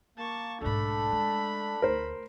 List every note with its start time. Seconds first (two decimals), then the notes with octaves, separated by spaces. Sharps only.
0.18 A#3 A5 C#6
0.61 B1 G#2 A3 D4 A4 B5
1.12 G#3
1.82 D2 A#4 C5